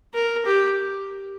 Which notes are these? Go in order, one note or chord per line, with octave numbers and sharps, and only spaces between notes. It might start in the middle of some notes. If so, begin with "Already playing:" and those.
A#4
G4